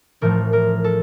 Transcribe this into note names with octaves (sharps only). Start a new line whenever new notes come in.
A1 A2 F3 A3 A#4
A#4
A4